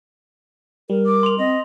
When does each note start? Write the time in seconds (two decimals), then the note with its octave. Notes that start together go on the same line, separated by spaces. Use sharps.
0.90 G3 A#4
1.06 D6
1.23 C6 F7
1.39 C4 D#5